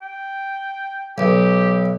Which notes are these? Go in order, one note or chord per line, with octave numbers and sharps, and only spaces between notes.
G5
B1 G4